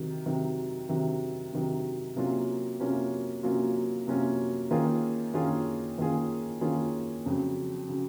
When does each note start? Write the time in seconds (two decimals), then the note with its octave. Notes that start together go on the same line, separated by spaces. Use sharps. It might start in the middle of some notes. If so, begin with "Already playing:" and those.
Already playing: C3 D#3 F#3
0.26 C3 D#3 F#3
0.89 C3 D#3 F#3
1.53 C3 D#3 F#3
2.16 C3 F#3 A#3 C#4 F4
2.80 C3 F#3 A#3 C#4 F4
3.43 C3 F#3 A#3 C#4 F4
4.07 C3 F#3 A#3 C#4 F4
4.71 D#3 A#3 C#4 F4 G#4
5.34 D#3 A#3 C#4 F4 G#4
5.98 D#3 A#3 C#4 F4 G#4
6.61 D#3 A#3 C#4 F4 G#4
7.25 F2 C#3 F#3
7.89 C#3 F#3